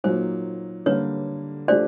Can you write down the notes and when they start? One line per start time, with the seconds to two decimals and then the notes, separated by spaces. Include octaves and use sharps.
0.04 A#2 F#3 A#3 D#4 C5
0.86 D3 G3 A#3 B4 C#5
1.68 F3 A3 D4 G4 C5 D5